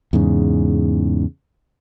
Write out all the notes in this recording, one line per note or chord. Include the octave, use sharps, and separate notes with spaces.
E2 G#2 C#3